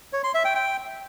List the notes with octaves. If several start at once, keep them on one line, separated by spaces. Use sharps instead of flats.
C#5
C6
E5
G5
G5